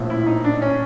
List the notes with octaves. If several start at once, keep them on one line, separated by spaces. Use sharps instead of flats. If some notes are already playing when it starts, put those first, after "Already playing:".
Already playing: A#1 A2 F3
E4
D#4
D4
C#4